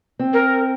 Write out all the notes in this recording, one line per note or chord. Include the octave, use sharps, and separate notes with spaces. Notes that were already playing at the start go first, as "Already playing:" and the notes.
C4
A#4